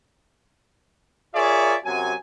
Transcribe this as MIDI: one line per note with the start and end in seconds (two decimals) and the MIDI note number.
1.35 1.75 65
1.35 1.75 68
1.35 1.75 70
1.35 1.75 73
1.35 1.75 74
1.35 1.75 76
1.85 2.13 42
1.85 2.13 48
1.85 2.13 54
1.85 2.13 80